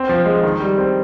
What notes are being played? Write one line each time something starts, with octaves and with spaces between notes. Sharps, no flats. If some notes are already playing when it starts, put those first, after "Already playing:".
Already playing: C4
F3
G#3
D#3
G3
C4